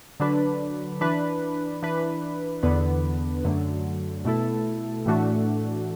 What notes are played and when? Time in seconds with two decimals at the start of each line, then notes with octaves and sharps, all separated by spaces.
0.20 D3 F#3 D4 B4
1.01 E3 D4 B4
1.83 E3 D4 B4
2.63 E2 D3 B3 D4 B4
3.44 F#2 D3 F#3 A3
4.25 B2 A3 E4 A4
5.06 A2 E3 A3 D4 F#4